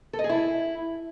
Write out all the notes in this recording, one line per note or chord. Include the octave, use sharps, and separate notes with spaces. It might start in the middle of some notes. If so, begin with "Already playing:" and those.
A4
D#5
G#4
E4